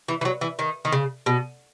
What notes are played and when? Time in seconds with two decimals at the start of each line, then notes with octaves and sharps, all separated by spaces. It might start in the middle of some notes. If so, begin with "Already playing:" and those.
0.08 E3
0.21 E3
0.25 F#3
0.41 E3
0.59 D#3
0.85 D#3
0.92 C#3
1.26 B2